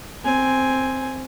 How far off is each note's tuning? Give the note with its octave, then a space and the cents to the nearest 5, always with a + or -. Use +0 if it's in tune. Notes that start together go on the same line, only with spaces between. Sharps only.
C4 +0 G#5 +0